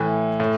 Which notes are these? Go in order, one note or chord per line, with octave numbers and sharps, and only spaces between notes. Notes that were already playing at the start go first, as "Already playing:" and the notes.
Already playing: A2 E3
A2